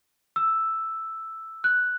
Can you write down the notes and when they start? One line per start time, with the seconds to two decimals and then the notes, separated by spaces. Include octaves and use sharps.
0.36 E6
1.64 F#6